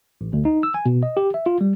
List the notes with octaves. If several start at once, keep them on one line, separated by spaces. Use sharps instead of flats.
A1
D2
D#4
E6
G#5
B2
D#5
G4
E5
F4
G3